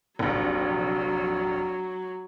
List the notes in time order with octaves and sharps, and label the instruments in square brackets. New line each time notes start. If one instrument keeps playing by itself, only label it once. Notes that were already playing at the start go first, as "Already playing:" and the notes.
[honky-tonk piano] F1 A#1 [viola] F#3